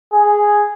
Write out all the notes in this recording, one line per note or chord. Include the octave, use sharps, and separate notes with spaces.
G#4